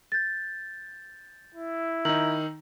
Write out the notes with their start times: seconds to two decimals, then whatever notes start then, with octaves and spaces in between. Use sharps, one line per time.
0.12 G6 A6
1.55 E4
2.05 D#3 D#4 A#5 E6 F#7